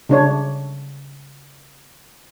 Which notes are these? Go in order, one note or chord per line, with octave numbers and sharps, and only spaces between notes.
C#3 D4 C#5